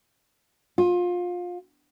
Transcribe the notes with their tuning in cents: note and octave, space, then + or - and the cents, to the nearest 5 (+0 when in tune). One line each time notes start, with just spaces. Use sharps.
F4 +25